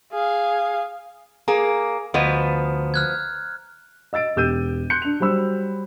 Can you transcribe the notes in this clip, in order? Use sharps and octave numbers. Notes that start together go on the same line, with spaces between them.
G#4 F5
A#3 G#4 A#5
D2 F3 B3 D#5
F6 F#6 G#6
D#5 E6 A6 D7
E1 G4 E6 G6 D#7
C6 F#6 G6 C#7
D4 F7
F#3 G3 C5 B5 E6